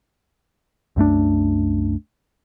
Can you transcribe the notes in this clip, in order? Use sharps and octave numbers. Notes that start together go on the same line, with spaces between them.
C2 F#2 A3 D4